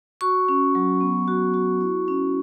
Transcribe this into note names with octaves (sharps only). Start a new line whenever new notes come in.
F#4 C#6
C#4
F#3
B3
F#4
F#4
E4
C#4